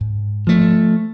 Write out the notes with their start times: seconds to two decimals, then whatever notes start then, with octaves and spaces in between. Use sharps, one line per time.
0.01 G#2
0.47 F3 A3